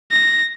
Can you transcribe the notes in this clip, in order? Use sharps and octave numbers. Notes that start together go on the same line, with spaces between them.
A#6